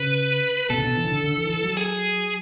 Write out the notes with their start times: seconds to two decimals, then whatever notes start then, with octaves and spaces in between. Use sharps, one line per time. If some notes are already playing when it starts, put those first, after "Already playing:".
Already playing: C#3 B4
0.70 B2 A4
0.78 C#3
0.83 B2
0.97 E3
1.05 C#3
1.10 D3
1.24 D3
1.37 E3
1.50 E3
1.64 F#3
1.77 G#4